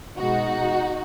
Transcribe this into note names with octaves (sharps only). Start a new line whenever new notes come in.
B2 G#3 D#4 F#4